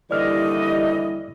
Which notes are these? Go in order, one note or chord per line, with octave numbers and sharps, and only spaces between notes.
D#2 D3 E3 G3 E4 D5 D#5 F6